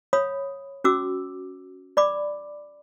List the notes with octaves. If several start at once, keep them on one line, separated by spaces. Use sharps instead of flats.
C#5 F5 B5 D#6
C#4 F#4 D6 E6
D5 B5 D6